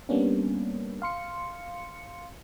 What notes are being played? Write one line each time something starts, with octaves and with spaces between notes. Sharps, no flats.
G3 A#3 B3 C#4 D4
F5 C6 C#7